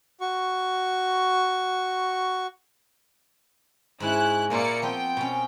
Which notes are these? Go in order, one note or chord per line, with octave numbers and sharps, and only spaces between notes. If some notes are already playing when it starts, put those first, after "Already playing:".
F#4 C#6
G#2 G#3 C#4 E4 F#6
A#2 A#3 E4 F4 D5 C#7
F3 B3 C4 G5
B2 C#4